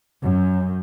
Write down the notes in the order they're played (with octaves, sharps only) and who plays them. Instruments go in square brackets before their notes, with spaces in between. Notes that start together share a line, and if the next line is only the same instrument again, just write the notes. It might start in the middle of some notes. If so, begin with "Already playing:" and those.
[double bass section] F#2